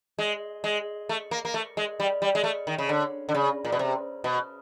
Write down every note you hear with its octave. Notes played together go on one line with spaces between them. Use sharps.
G#3
G#3
A3
A#3
A#3
A3
G#3
G3
G3
G#3
A3
D#3
C#3
D3
D3
C#3
A#2
B2
C3
B2